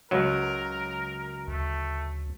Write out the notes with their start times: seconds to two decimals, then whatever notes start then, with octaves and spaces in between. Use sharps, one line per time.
0.11 C#2 F#3 A#4
1.48 D2 A3